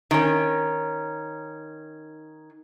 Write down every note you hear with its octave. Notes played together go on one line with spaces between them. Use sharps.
D#3 C#4